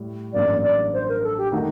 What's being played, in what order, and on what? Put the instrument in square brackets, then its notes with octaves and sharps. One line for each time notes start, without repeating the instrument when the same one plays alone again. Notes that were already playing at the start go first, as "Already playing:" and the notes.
Already playing: [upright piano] A2 G3
[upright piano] A1 G2 F#3 A#3 [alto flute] D5
[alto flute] D5
C5
A#4
A4
G4
[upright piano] D#3 A3 D#4 F#4